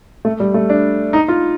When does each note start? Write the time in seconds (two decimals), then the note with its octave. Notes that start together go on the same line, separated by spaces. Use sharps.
0.25 A3
0.40 G3
0.54 A3
0.70 D4
1.13 D#4
1.28 F4